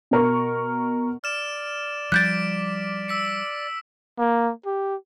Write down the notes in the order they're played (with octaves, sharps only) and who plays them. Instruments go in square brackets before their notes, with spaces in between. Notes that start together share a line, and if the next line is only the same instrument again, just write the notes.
[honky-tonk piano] B2 A#4 C#6
[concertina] D5 [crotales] F6 E7
[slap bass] F3 G3 [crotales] D6 B6 D7 [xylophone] F#6 G6 A6
[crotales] E6 B6 C#7
[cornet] A#3
G4